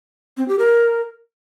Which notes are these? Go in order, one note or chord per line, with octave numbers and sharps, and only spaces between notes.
C4
G4
A#4